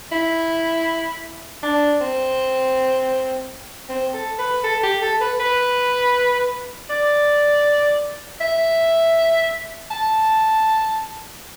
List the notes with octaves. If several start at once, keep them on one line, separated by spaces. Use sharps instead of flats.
E4
D4
C4
C4
A4
B4
A4
G4
A4
B4
B4
D5
E5
A5